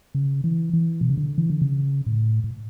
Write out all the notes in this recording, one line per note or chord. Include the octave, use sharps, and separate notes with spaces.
C#3
E3
E3
B2
C#3
D3
E3
D3
C#3
A2
A2